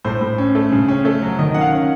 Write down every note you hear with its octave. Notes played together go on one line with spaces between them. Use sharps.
A2 C5
A2
C#4
A3
C#3
C#4
A3
F#3
D#3 D#5
D#3 F#5
F5
C#4